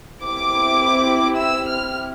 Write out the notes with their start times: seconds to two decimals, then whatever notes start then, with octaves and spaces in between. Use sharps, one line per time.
0.24 C4 E4 G4 D6
1.39 E6
1.69 F6